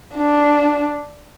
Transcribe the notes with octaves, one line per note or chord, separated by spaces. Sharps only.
D4